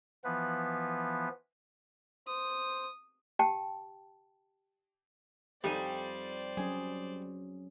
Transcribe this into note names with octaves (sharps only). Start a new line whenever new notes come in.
E3 F3 B3 B4
C5 D#6
G4 G5 A5
F2 G3 D#4 C5 D5 G#5
F#3 C#4 G#4